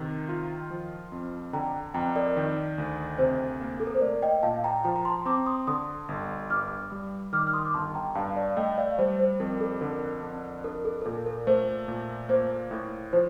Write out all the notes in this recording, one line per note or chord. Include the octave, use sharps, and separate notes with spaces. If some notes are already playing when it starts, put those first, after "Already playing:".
Already playing: C3 D#3
F4
F3
F2
D3 G5 A#5
F2 G5 A#5
A#4 D5
D#3
D2
C3 C5
A#3
A4
A#4
C5
A3 A#4 D5
D#5 G5
A#2 F5 A5
G5 A#5
F3 G5 A#5
A#5
A5 C6
C4 A#5 D6
C6 D#6
D3 C6 D#6
G1
G2 D6 F6
G3
D#3 D6 F6
F6
C6 D#6
D6
G1 A5 C6
G5 A#5
G2 F5 A5
D5 F5
A3 D#5 G5
D5 F5
G3 C5
C5
F2 A#4
A4
D3 A#4
F2
D4 A#4
A4
A#4
A#2 A4
A#4
A3 C5
A#2
A#3 C5
A2
F3 C5